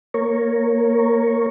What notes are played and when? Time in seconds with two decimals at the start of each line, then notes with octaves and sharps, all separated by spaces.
0.14 A#3 A#4 C#5